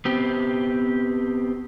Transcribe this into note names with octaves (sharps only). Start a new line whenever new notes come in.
B3 C4 G4